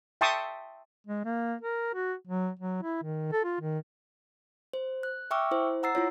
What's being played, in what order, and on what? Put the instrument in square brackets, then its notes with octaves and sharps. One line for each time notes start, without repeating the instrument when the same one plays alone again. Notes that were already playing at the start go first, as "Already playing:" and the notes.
[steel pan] E5 G5 A5 C6 C#6 D#6
[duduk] G#3
A#3
A#4
F#4
F#3
F#3
E4
D#3
A4
F4
D#3
[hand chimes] C5
F#6
E5 G5 C#6 D6 E6 F6
E4 C5
F#5 A#5 E6 A6 C7
E4 F4 C#5